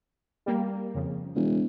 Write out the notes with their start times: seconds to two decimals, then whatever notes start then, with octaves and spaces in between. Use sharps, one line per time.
0.46 G3 A#3
0.94 F2 C#3
1.35 E1